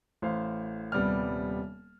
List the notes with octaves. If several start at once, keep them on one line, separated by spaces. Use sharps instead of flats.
A1 C5 F5
D#1 C3 G3 B3 D5 F6